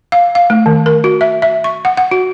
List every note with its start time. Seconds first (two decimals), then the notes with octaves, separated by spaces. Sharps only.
0.12 F5
0.35 F5
0.50 A3
0.66 D#3
0.86 A#4
1.04 F#4
1.21 E5
1.42 E5
1.64 C#6
1.85 F#5
1.97 F#5
2.11 F#4